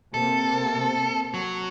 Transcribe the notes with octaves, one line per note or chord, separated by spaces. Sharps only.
C3 A#3 C4 A4
F#3